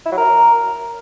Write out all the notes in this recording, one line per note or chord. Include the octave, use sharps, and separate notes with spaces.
E4
F#3
A#4